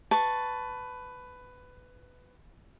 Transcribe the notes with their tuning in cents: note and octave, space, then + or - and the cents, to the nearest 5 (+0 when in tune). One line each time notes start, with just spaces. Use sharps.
B4 +15 A5 +0 C#6 +0